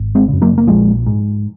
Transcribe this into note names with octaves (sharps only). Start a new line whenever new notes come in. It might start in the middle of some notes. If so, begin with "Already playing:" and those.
Already playing: G#1
G#3 C4
F#2 C#3
F#3 A#3
A#3
A#1 F3 G#3
G#2